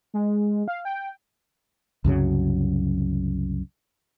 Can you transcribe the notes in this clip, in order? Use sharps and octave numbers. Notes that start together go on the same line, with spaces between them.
G#3
F5
G5
C2 F#2 C#3 F#3